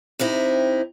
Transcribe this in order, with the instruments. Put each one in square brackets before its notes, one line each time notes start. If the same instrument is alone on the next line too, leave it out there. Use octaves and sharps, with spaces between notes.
[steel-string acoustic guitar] C3 C4 D#4 E4